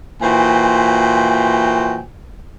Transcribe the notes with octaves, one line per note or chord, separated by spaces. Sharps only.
A#2 E3 F#4 C5 G5 G#5